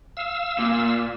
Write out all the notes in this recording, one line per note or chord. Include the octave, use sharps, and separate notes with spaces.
F5 E6
A#2